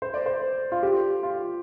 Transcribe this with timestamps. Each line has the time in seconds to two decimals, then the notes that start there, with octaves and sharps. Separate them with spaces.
0.02 C5
0.14 D5
0.26 C5
0.72 F4
0.83 G4
1.23 F4